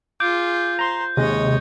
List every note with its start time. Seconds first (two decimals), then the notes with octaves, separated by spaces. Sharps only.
0.20 F4 G#4 D6 G6
0.79 C5 A#5 C6
1.17 D#2 C3 G#3 C#5 D#5